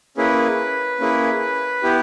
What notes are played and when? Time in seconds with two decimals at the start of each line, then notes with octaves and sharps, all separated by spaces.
0.17 A#3 C#4 E4 G#4 B4
1.00 A#3 C#4 E4 G#4
1.83 B3 E4 G4